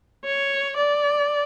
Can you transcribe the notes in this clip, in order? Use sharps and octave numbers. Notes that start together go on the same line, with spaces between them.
C#5
D5